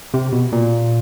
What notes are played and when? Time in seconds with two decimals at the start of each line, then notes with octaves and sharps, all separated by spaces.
0.14 C3
0.32 B2
0.52 A#2